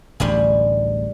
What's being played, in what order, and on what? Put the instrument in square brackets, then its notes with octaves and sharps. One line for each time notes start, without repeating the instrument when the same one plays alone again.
[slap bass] D1 A1 [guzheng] G3 D4 G#4